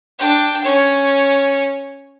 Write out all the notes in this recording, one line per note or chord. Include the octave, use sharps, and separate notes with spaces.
D4 G5
C#4 C#5